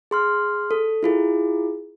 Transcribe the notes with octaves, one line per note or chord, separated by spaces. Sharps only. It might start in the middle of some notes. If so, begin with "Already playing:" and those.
G#4 C6 F6
A4
E4 F4 G#4